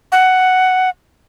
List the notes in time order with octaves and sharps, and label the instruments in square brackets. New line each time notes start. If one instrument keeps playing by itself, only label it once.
[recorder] F#5